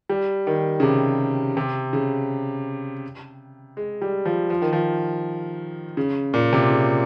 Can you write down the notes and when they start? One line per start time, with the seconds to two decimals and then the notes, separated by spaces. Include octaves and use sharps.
0.09 G3
0.47 D#3
0.80 C#3
0.83 C3
1.57 C3
1.93 C#3
3.77 G#3
4.02 G3
4.25 F3
4.50 F3
4.62 D#3
4.73 F3
5.97 C#3
6.34 A#2
6.53 C3
6.70 C#3